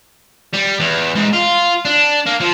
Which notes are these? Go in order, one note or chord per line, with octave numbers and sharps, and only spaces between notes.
G3
E2
G#2
F4
D4
A#3
F3